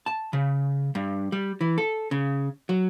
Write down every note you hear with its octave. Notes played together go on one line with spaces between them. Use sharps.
A5
C#3
G2
G3
E3
A4
C#3
F#3